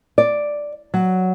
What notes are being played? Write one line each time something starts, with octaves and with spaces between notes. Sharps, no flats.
D5
F#3